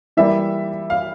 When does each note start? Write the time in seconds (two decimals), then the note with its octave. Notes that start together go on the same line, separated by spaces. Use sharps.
0.17 E3 G3 A#3 E5
0.90 F5